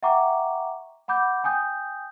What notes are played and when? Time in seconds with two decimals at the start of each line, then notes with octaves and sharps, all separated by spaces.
0.03 E5 F#5 G5 A#5 C#6 D6
1.08 F#5 B5 D6 G6
1.44 G5 G#5 D#6 G6